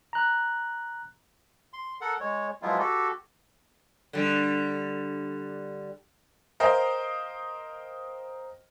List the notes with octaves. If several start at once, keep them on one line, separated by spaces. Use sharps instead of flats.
A#5 F#6
C6
A4 A#4 F#5
G#3 C#5
F3 F#3 G#3 B3 E4 F4
F#4 G4 A4
D3 G3
A#4 C5 D#5 F5 G5